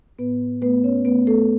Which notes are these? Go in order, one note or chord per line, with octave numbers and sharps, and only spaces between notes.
A2 B3 B4
A3 B3 B4
C#4 C#5
A3 B3 B4
A3 A4